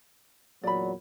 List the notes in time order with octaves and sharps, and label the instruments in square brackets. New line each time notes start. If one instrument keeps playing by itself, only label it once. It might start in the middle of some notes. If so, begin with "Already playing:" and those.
[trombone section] E2 A#2 F#3 [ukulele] D5 B5